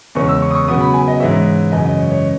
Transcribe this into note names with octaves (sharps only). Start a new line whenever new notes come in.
E2 C#3 G#3 C#4 C#6
E6
C#6
D#6
C#6
C#3 F#3 B3 D#6
B5
G#5
D#5
G#2 E3 G#3 C#4 E5
F#2 C#3 E3 D#5
D#5
C#5
C#5